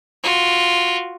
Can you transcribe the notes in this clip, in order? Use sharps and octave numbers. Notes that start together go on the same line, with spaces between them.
F4 F#4